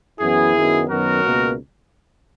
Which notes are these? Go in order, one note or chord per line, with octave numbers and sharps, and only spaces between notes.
F#2 E3 B3 E4 G#4
F#2 D#3 F#3 B3
F#2 D#3 F#3 B3 F#4 A#4
C#2 B2 A#3